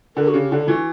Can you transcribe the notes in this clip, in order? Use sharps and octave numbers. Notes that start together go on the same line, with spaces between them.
D3 A#4
F#4
C#3 G4
D3 D4
E3 F#4